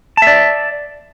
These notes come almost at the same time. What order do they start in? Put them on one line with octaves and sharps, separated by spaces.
A5 E5 D5